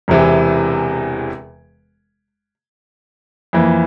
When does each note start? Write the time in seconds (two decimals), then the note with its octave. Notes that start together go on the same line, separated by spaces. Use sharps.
0.08 E1 E2 C3 E3
3.53 F2 E3 A#3